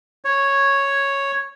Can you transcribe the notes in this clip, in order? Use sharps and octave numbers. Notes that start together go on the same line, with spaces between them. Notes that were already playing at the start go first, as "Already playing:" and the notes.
C#5